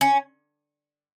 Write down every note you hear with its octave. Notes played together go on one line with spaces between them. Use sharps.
C#4